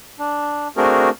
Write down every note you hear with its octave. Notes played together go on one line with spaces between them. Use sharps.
D4
A3 C4 D4 F#4 G#4 A#4